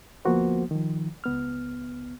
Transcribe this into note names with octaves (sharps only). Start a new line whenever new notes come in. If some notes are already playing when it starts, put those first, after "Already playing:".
D2 F3 A#3 B3 F#4 C5
D#3 F3
C#2 B3 F6